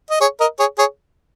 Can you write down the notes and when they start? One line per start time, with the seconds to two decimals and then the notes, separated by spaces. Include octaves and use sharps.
0.10 D#5
0.20 G#4 C#5
0.40 A#4 D#5
0.59 G#4 C#5
0.78 G#4 C#5